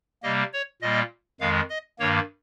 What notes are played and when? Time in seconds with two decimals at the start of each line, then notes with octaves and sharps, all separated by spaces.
0.23 C3 G3 A#3 D#5
0.53 C#5
0.82 A#2 G3 A#3 D#5
1.40 F2 D#3 G#3 F5
1.69 D#5
1.99 G2 D#3 A#3 C#5